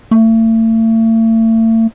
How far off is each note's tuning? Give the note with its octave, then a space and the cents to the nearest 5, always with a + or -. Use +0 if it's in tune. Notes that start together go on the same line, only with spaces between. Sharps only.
A3 +40